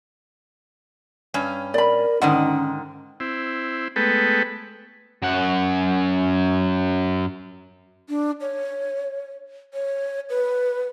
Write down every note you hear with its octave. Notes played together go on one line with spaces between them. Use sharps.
G2 C#4
A#4 D5 B5
G#2 D3 D#3 C#4 F#5
C4 E4
G#3 A3 B3 A4 B4 G5
F#2 F#5
D4
C#5
C#5
B4